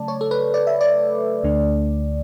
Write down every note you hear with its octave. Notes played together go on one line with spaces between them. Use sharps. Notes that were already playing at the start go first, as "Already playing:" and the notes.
Already playing: C#3 F#3 A3 D5 A5
C#5
A4
B4
D5
E5
D5
D2 D3 A3 D4